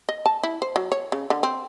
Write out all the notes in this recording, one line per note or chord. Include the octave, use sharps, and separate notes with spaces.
D#5
A5
E4
C5
F#3
C#5
C#3
D3
C4